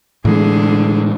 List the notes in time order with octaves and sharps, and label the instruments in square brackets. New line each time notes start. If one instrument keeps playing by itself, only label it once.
[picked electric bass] A2 E3 G#3 [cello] D3 G#4